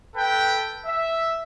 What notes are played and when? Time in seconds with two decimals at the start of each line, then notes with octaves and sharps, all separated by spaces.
0.15 A4 B4 G5
0.86 E5